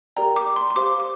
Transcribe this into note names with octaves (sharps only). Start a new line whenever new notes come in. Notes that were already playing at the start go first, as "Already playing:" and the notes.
G4 A#4 D5 G5 A#5
D6
C6
C6
G4 C5 F5 D6
D6